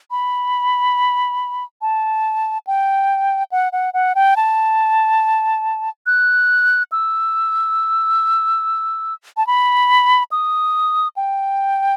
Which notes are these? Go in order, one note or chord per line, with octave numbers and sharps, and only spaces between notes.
B5
A5
G5
F#5
F#5
F#5
G5
A5
F#6
E6
A5
B5
D#6
G5